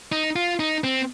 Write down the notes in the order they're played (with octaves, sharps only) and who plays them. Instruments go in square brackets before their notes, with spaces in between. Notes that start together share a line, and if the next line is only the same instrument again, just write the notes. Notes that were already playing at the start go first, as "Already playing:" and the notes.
[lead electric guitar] D#4
F4
D#4
C4